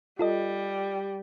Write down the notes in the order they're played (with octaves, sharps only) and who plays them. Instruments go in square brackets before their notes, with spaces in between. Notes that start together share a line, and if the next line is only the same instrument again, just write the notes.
[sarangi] G3 [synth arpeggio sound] F4 A4 D#5